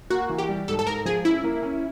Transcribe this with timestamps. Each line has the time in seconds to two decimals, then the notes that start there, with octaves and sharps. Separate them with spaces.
0.10 A#3 F#4
0.29 E3
0.38 G4
0.49 G3
0.68 G#2 A4
0.79 A4
0.87 G#2 A#4
1.05 F3 G#4
1.25 C#4 E4
1.44 A#3
1.63 C#4